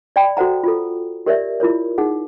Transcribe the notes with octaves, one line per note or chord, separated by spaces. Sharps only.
D5 G5 B5
F#4 A4 C5 F#5 A#5
F4 A4
G4 A#4 C#5 D5 E5
E4 F4 A#4 C#5
D#4 G#4 F#5